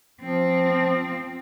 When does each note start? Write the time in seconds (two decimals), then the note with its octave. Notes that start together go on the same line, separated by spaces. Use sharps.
0.23 F3 C4